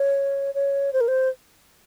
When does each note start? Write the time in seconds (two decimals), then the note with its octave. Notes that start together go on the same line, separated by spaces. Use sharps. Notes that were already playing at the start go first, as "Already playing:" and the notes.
Already playing: C#5
0.55 C#5
0.93 C5
1.01 A#4
1.08 C5